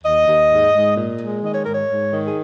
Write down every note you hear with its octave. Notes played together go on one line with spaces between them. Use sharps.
D#2 D#5
D#2
G#2
G#2
A#2
G#3
D#3 D#5
C#5
G#2 A#4
C#5
G#2
D#3
G#4